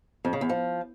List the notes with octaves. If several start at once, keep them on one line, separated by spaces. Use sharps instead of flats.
F2
C#3
E2
F3